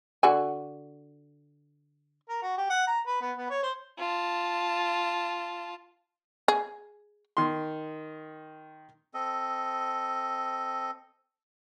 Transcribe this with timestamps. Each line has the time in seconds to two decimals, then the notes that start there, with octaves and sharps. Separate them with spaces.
0.23 D3 F#4 G#5
2.29 A#4
2.42 F#4
2.58 G4
2.70 F#5
2.87 A#5
3.07 B4
3.21 B3
3.37 B3
3.50 C#5
3.63 C5
3.98 F4 A5
6.48 G#4
7.37 D#3 C6
9.14 C4 A4 D#5